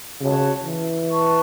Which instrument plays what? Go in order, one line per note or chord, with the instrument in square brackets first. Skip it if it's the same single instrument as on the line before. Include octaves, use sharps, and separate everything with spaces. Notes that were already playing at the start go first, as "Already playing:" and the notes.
[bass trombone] C#3 [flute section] F#4 C#5 A5
[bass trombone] E3
[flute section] B4 A5 C#6